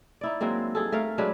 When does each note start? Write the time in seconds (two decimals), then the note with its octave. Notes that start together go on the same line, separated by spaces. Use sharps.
0.21 D#4 E4 D5
0.41 F#3 G#3 A#3 C4
0.75 G2 G#4 A4
0.92 A3 A#4 F5
1.18 F#3 G#3 D4 B4